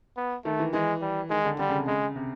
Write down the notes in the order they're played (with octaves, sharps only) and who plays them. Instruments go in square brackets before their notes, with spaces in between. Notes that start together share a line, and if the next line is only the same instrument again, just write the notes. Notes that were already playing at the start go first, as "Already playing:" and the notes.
[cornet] B3
[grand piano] D#3 [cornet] A3
[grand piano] E3
[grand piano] E3 [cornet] G#3
[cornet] G3
[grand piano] D#3 [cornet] G#3
[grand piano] D3
[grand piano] D3 [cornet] G3
[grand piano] C#3
C3
[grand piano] C#3 [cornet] G#3
[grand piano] C3